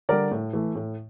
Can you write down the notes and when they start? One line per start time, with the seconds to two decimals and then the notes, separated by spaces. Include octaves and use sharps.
0.09 D3 G3 A#4 D5
0.31 A2
0.53 E3 A3
0.75 A2